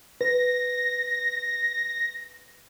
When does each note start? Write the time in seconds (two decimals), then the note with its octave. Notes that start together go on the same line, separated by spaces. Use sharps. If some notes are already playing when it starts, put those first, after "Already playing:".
0.21 B4 A#6